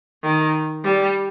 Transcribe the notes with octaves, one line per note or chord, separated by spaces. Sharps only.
D#3
G3